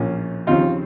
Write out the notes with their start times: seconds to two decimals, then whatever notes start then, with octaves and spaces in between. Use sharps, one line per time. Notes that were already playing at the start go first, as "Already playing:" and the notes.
Already playing: A#1 A2 F3 A#3 C#4
0.47 D#2 C#3 F3 C4 D#4 F4